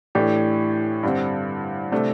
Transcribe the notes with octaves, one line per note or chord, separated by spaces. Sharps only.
A2 E3 A3 D4 G4
G2 D3 G3 C4
C3 A3 D4